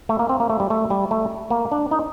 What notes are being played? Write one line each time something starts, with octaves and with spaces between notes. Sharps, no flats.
A3
A#3
C4
A#3
A3
G3
A3
G3
A3
A#3
D4
D#4